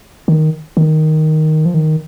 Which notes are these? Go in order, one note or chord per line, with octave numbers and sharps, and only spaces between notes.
D#3
D#3
F3
D#3